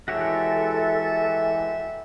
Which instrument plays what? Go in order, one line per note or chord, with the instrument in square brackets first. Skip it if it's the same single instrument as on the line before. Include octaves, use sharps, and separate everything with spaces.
[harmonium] E3 G#3 [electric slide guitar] F#4 G4 C#5 [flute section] A4 [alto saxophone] E5